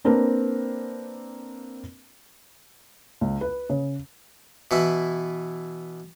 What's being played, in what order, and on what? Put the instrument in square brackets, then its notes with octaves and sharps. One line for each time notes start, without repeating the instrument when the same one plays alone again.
[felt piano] A#3 C4 D4 A#4 B4
C#2
B4
C#3
[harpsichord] B2 E3 E4